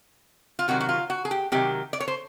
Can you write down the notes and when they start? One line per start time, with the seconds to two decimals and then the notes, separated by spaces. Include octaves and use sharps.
0.59 F4
0.68 C3 D#3 F#3 F#4
0.80 F#4
0.89 F4
1.10 F#4
1.25 G#4
1.31 G4
1.52 C3 D#3 F#3 G4
1.93 D5
2.00 C#5
2.08 C5